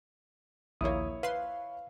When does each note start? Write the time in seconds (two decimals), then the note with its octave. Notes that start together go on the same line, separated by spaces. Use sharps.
0.81 A#1 D#2 A#3 E4 C#5 D#6
1.23 B4 C5 F5 C6